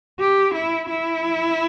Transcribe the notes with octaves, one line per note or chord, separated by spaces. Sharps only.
G4
E4
E4